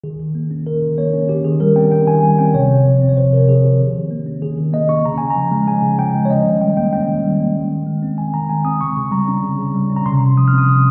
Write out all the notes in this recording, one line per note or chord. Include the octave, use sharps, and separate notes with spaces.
D#3 G#4
D#3
A#3
C#4
D#3 A#4
D#3
A#3 C#5
C#4
D#3 G4
D#3 G#4
G3 A#4
C4 G5
D#3 G5
D#3 G#5
G3 G#5
C4 G5
C3 C#5
C3
F3
C4
C#5
C3 C5
C3 A#4
F3 G#4
C4 G4
D#3
D#3
A#3
C#4
D#3 G#4
D#3
A#3 D#5
C#4 C#6
C#3 A#5
C#3 G#5
A#5
F3
G#3
C#3 G#5
C#3
F3 G5
G#3
C#5
C#4 D#5
D#3
G3 G5
A#3 G5
C#4 G5
D#3
G3
A#3
D#3
D#3
G#3
C4
D#3 G#5
D#3 A#5
G#3 G#5
C4 D#6
C#3 C#6
C#3
G3 A#5
C#4
C#3
C#3
G3
C#4
A#5
C3 C6
C3
F3 D#6
F6
C4
D#6
C3 D#6